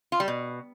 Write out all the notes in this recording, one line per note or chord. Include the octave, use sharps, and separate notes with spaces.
F4
G3
B2